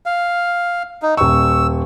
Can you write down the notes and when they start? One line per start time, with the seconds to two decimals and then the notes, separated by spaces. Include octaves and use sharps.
0.06 F5
1.02 D#4
1.17 D#1 C#6 E6